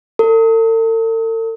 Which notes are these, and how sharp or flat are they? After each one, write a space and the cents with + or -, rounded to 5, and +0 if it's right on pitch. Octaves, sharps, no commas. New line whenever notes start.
A4 +45